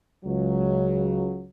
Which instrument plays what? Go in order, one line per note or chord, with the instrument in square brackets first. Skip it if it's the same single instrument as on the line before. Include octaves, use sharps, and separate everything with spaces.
[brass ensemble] C#2 C#3 F#3